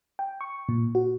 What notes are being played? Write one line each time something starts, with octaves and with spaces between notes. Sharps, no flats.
G5
C#6
A#2
F#4